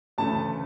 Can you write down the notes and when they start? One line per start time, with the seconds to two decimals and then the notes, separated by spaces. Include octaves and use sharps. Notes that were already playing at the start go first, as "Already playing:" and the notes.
0.18 D2 C#3 E3 A3 A5